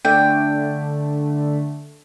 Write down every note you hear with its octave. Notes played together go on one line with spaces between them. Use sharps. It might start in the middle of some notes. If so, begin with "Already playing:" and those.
D3 A3 D4 G5